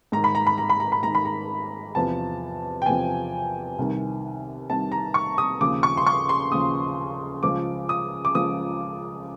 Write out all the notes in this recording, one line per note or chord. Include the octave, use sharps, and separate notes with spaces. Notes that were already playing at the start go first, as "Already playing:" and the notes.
G#2 D#3 A#5
B5
A#5
B5
A#5
B5
A#5
B5
G#2 D#3 A#5
B5
A#5
E2 C3 F3 A5
G5
E2 C3 F3 G#5
C2 C3 D#3
C2 C3 D#3 A5
A#5
C#6
D#6
D#2 C#3 F3 D6
C#6
C6
C#6
C6
D#2 C#3 F3 D#6
C#2 C#3 F3 D6
D#6
D6
C#2 C#3 F3 D#6